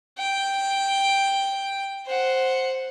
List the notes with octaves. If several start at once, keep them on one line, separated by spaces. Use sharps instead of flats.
G5
C5 F#5